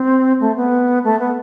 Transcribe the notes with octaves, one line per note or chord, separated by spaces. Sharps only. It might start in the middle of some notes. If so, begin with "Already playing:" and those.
Already playing: C4
A3
B3
A3
B3